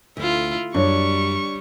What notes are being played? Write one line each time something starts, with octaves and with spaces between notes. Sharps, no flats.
D2 E4 F4
F#2 G3 D4 C#5 C#6